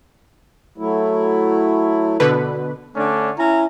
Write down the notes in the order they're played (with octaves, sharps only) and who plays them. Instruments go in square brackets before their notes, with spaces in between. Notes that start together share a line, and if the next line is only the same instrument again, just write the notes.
[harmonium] F#3 A3 E4
[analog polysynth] B2 D3 B4
[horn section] D3 A3 C#4 D4
C#4 E4 A#5